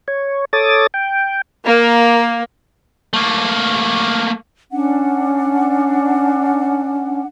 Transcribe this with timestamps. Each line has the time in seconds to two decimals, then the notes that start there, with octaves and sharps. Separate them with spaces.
0.08 C#5
0.53 A4 C#5 D6 D#6 A6
0.94 G5
1.65 A#3
3.13 A3 A#3
4.71 C#4 D4 F#5